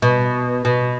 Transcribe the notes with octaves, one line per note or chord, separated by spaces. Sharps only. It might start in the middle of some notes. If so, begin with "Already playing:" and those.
B2
B2